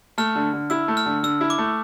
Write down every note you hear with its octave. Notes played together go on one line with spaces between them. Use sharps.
A3 F6
D3
D3
E4 E6
A3
F6
D3
D3 E6
E4
D6
A3